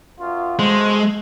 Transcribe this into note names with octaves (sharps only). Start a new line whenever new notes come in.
F#2 F4
B2 G#3 A3 C5